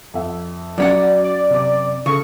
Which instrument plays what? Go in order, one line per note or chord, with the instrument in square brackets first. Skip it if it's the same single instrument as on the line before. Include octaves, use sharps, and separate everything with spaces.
[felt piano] F2 E5
[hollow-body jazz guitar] F#2 C#4 F#5 [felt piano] F#3 [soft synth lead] D5
[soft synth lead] D5
[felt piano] C3 D6
[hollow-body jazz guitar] C#3 [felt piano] A4 [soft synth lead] C#6